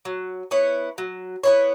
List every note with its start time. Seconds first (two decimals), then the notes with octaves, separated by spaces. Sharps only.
0.05 F#3
0.51 B3 E4 C#5
0.98 F#3
1.44 B3 E4 C#5